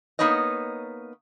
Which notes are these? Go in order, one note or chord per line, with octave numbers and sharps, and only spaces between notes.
A#3 B3 D#4 C#5 D#5